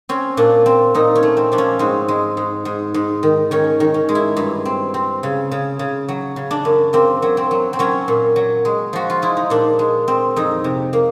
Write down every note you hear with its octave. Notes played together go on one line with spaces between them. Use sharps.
C4 C#4
A#2 D4
C4
A#2 D#4
C#4
A3
C4
F3 D4
C#4
G#2 C4
G#3
G#2
G#2
G#2
D#3
D#3 C#4
D#3
C#4
G#3
E4
G2
C4
C4
C#3
C#3
C#3
F#3
C#3
D4
F#2
A#3 C4
F#3
C4
F#3
C4
F#3 C#4
A#2
F#3
G#3
F3 F#4
F4
G#3 E4
D#4
A#2 D4
G#3
C4
F2 D#4
C3
A#3